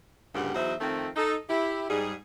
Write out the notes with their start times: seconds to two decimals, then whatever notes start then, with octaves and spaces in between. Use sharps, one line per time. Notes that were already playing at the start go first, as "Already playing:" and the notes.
0.35 D2 G2 A#2 C#3 G4 F#5
0.54 E2 F#3 D#4 F#4 C5 E5
0.81 F2 D#3 A3 C4
1.16 D#4 A4
1.49 E4 G4
1.90 G#2 G3 G#4